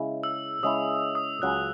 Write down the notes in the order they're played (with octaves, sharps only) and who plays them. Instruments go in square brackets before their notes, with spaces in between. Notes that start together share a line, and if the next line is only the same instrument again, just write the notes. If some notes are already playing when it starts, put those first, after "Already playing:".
Already playing: [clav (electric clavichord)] C#3 G#3 C#4 E4
[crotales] E6
[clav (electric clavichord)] C#3 G#3 C#4 E4 [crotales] D#6
[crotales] D#6
[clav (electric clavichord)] C#2 C#3 F#3 C#4 [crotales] F#6